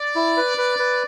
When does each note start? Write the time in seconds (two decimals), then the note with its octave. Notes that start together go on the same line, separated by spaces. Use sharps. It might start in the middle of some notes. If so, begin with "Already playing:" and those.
Already playing: D5
0.15 E4
0.37 B4
0.58 B4
0.79 B4